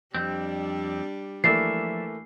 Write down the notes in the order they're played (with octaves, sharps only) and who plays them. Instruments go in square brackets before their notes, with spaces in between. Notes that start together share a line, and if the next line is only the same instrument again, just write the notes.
[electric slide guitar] F2 C4 [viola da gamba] G3 D4
[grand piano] E3 A3 A#3 [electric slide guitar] F3 D5 E5 [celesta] C7